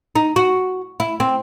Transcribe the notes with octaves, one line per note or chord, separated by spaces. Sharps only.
D#4
F#4
E4
C4